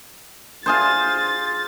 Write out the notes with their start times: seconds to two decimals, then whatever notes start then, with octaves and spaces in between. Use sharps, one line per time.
0.66 F4 G#4 C5 A6